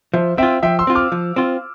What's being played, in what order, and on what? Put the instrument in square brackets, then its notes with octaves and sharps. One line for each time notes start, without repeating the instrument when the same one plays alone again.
[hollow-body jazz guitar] F3 [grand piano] C5 E5
[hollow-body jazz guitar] C4 F4 [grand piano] E5 G5
[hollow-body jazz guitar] F3 [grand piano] E5 G5
[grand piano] C6 E6
[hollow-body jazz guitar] C4 F4
[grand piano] D6 F6
[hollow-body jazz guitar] F3
C4 F4